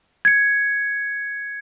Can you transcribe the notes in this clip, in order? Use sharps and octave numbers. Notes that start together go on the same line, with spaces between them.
G#6 C#7